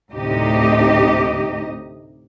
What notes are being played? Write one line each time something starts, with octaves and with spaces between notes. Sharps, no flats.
D2 A2 C3 D#4 G4 D#5